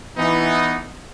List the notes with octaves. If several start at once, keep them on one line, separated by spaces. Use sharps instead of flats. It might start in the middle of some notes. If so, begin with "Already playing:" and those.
E3 B3 D#4